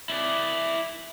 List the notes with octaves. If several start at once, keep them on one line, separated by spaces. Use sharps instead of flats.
E4 D5